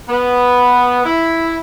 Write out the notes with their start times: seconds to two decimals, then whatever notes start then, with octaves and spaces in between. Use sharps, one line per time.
0.09 B3
1.06 E4